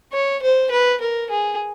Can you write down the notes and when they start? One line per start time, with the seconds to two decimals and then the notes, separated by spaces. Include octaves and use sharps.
0.13 C#5
0.42 C5
0.71 B4
1.01 A#4
1.30 G#4